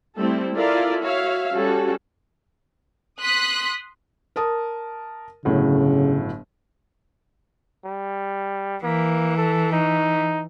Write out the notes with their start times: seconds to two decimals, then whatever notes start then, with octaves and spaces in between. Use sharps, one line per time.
0.17 G3 A3 C4 E4 A4
0.55 E4 F4 A4 A#4 D5 F5
1.01 F#4 C#5 E5 F5
1.53 G3 C#4 F#4 A4
3.20 C6 D#6 F#6 B6
4.36 A#4 A5 D#6
5.45 G1 A2 C#3 F#3
7.85 G3
8.83 E3 A#3
9.37 A4
9.72 D#4